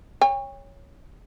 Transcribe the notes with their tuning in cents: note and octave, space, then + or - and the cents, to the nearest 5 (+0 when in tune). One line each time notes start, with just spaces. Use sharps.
C#5 +0 G5 +45